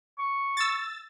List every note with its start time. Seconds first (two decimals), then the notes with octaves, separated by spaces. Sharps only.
0.19 C#6
0.57 E6 A6